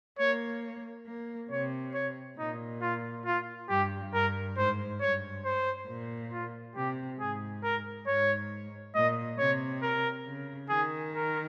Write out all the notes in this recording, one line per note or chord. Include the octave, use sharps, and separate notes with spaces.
A#3 C#5
A#3
C3 C#5
C#5
A#2 D#4
F4
F4
G2 G4
G2 A#4
G#2 C5
G2 C#5
C5
A#2
F4
C3 G4
G#2 G#4
A#4
G#2 C#5
A#2 D#5
C3 C#5
A#4
C#3
D#3 G#4
A#4